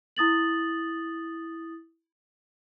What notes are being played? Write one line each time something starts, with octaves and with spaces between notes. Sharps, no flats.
E4 D#6 A6 F#7